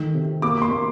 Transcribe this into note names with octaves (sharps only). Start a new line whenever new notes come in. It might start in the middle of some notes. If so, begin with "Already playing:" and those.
Already playing: D#3 A3
C3
A#3 D6
D6
C6
A#3